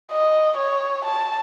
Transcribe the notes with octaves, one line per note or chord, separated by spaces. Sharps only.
D#5
C#5
A5